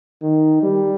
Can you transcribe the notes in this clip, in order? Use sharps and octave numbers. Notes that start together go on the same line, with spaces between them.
D#3
G3